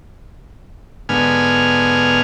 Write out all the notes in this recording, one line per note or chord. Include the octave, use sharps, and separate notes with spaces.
G#2 D3 B3 G#5 F6